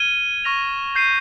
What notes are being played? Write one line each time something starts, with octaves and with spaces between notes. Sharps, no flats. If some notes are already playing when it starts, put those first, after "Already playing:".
Already playing: F6 G#6 D#7 G7
C#6 F6 A#6 F7
G6 C7 D#7 G7